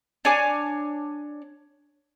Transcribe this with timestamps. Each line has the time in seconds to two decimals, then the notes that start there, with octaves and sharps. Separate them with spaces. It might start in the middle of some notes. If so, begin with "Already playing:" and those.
0.25 D4 C#5 G#5 D6